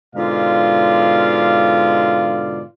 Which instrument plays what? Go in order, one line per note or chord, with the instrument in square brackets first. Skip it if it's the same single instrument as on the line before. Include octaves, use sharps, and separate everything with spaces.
[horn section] G#2 B2 D3 F4 D5 F5